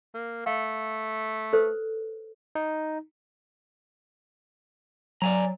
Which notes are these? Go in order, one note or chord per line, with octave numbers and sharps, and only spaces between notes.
A#3
A3 F5
A4 B4 C5
D#4
F#3 D5 G#5 A#5